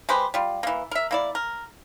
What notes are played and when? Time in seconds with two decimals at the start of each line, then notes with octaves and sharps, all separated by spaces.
0.09 G#3 G4 B4 C5
0.34 G3 F4
0.63 E3 A#3
0.91 A#4 E5
1.11 A#3 E4 D5
1.35 A#4